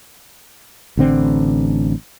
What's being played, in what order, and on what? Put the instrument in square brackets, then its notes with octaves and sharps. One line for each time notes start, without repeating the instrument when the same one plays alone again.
[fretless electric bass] A1 D3 C4